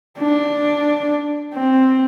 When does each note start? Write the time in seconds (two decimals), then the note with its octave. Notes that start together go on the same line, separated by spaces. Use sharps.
0.19 D4
1.55 C4